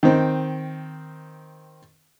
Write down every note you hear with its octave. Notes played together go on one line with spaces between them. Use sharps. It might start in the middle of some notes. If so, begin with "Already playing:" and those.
D#3 C4